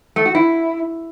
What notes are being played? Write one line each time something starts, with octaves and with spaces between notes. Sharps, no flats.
A3
F#4
E4